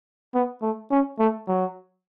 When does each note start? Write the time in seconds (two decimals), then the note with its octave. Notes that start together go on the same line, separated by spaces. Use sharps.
0.34 B3
0.62 A3
0.91 C#4
1.19 A3
1.48 F#3